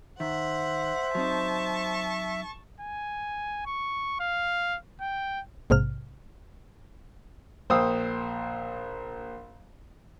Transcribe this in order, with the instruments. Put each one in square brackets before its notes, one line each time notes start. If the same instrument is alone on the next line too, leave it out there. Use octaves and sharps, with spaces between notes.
[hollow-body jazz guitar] D#3 [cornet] C5 [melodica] E5 [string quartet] F#5
[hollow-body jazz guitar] F#3 C4 D#4 [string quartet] A5 C#6
[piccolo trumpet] G#5
C#6
F5
G5
[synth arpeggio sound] A#1 G#2 C3 F6
[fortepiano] A#1 C5 F5 G5 D#6 E6